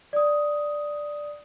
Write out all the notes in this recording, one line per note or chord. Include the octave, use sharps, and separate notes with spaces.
D5 D#6